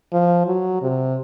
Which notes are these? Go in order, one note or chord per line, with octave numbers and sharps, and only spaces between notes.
F3
F#3
C3